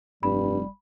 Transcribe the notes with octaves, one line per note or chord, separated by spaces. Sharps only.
F1 G2 G3 B5